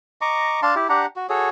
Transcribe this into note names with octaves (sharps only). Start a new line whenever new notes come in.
D#5 A#5 C#6 D6
D4 F5 A5 C6
E4 G4
D4 G4 F#5 A#5
F#4
F#4 G#4 A4 C#5